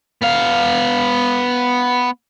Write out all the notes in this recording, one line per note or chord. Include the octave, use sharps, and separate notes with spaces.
B3 F5